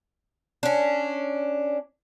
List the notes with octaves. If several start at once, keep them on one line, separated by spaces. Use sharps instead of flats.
C#4 D4